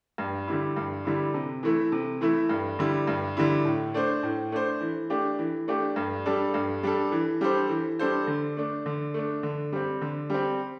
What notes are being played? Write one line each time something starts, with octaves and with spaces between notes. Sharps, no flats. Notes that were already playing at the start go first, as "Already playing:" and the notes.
G2
D3 G3 E4
G2
D3 G3 E4
C3
E3 A3 E4
C3
E3 A3 E4
G2
D3 G3 E4
G2
D3 G3 E4
A2
A3 D4 C5
A2
A3 D4 C5
E3
A3 D4 G4
E3
A3 D4 G4
G2
G3 D4 A4
G2
G3 D4 A4
E3
G3 D4 A4 C5
E3
G3 D4 A4 C5
D3
A3 D4
D3
A3 D4
D3
G3 C4
D3
G3 C4